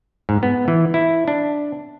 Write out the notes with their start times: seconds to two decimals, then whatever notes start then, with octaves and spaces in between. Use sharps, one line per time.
0.29 G#2
0.43 B3
0.68 E3
0.94 E4
1.28 D4